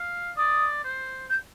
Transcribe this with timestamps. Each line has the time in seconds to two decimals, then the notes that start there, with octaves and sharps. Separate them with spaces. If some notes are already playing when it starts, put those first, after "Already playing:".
Already playing: F5
0.37 D5 D#6
0.84 C5
1.30 G6